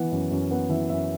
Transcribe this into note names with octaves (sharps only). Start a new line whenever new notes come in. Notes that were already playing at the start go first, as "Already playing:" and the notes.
Already playing: E3 B3 F#5
F#2
F#2
B3 F#5
E3 E5
F#2 E5